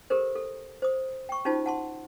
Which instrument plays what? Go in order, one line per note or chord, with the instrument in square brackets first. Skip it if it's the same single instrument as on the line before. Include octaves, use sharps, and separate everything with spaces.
[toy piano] G4 A4 A#4 C5
A4
C5 D#6
G5 C#6
C#4 D#4 F4 F#4 C5 A5
F#5 A5 C6